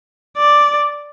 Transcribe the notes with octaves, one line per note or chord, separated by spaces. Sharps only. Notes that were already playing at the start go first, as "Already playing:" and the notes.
D5